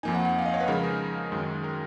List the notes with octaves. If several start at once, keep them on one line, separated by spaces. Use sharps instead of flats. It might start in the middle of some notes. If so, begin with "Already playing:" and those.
F2 F3 A#3 D#4 G#5
F#5
F#5
F5
D#5
C#5
B4
C#3 F3 G#3 D#4 A#4
G#4
F#2 D#3 G#3 C#4
A#4